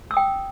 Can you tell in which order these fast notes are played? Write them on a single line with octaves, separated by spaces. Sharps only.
E6 D#6 G5